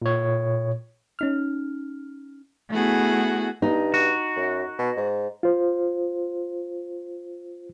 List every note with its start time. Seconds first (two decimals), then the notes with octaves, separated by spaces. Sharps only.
0.02 A#2 C#5
1.19 C#4 D#4 F6
2.70 A3 B3 E4 F#4 G#4
3.62 G2 D#4
3.94 F#4
4.37 F#2
4.79 B2
4.97 G#2
5.43 F4 C5